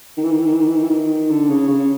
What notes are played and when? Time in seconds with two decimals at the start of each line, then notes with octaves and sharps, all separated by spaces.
0.17 D#3
0.24 E3
0.32 D#3
0.39 E3
0.46 D#3
0.53 E3
0.60 D#3
0.68 E3
0.76 D#3
0.83 E3
0.90 D#3
1.30 D3
1.49 C#3
1.68 C#3